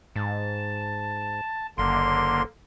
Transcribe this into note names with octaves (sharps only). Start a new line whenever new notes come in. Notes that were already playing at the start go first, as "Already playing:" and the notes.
G#2 A5
F#1 D3 A#3 C6